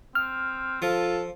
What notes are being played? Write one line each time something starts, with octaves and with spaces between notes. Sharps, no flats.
C4 F6
F3 F4 A4